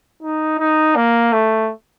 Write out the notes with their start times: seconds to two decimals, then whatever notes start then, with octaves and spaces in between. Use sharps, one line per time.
0.22 D#4
0.59 D#4
0.96 A#3
1.33 A3